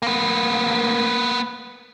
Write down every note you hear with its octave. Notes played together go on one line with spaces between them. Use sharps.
A#3 B3